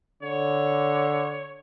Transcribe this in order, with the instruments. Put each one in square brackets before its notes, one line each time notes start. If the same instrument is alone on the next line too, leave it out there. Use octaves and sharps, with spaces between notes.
[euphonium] D3 [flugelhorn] C#5